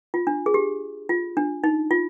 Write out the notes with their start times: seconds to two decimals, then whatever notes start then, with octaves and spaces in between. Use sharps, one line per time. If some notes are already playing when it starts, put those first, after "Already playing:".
0.14 F4
0.27 D4
0.46 G#4
0.54 G4
1.09 F4
1.37 D4
1.64 D#4
1.91 F4